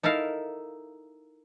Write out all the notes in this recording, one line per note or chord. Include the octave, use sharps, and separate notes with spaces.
D#4 E4 A4 A#4 F5